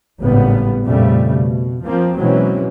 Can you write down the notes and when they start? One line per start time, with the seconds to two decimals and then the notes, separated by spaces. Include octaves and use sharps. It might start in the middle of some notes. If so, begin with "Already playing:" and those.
0.20 G#1 A2 C#3 G3 B3
0.84 F2 A#2 C#3 G3 A3
1.34 B2
1.84 F3 A#3 C4
2.16 B2 E3 F#3 G#3 C4 C#4